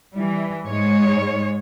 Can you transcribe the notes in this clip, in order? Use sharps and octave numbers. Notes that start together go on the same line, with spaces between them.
E3 G3
G#2 G#3 C#5